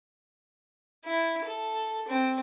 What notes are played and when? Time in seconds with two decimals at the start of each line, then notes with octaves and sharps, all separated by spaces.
1.05 E4
1.45 A4
2.08 C4